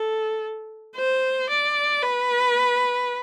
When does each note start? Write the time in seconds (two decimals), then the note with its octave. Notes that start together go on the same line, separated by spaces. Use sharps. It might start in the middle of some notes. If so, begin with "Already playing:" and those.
Already playing: A4
0.96 C5
1.50 D5
2.03 B4